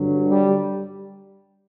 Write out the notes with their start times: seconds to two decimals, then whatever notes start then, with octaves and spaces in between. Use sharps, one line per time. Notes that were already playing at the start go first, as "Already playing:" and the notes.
Already playing: G2 D3 F#3
0.27 G3